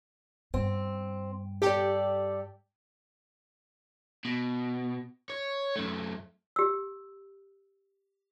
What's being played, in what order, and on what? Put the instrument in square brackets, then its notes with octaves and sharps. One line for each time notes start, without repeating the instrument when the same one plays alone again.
[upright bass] G2 [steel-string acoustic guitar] C4
[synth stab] G4 [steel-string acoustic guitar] A4 D5
[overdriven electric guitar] B2
C#5
F#2 A3
[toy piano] G4 E6